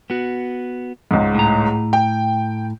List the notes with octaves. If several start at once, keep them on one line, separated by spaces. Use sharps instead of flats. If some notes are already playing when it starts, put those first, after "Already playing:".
B3 F#4
C#2 G#2
A2 A#5
G5